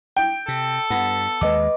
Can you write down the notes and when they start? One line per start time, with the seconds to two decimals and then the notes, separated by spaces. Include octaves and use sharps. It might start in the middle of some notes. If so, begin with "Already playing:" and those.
0.17 G5
0.48 C3 A4
0.90 G2 B3
1.41 D#2 G#3 B4 D#5 D6